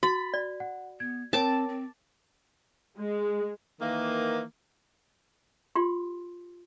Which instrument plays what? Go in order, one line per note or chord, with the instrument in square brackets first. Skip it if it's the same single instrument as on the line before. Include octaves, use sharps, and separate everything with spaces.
[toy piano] F#4 [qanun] B5 [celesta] A6
[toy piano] D5
[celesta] F#5
[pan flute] B3 [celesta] G#6
[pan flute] C4 [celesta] A#4 C#5 G5 [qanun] A5 D6
[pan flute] C4
[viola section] G#3
[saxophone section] D#3 E3 A#3
[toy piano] F4 G4 C6